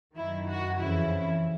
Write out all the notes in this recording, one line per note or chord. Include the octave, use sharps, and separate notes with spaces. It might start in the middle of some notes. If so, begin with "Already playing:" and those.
F#2 D#3 E4
F#4
F2 C#3 E3 E4